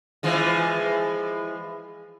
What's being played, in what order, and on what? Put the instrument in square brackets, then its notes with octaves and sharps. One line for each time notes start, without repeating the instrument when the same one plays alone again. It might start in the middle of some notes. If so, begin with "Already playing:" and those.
[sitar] E3 F3 G#3